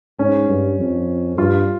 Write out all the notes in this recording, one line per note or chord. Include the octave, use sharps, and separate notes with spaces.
G#2 C#4
G2
F2
G2 F4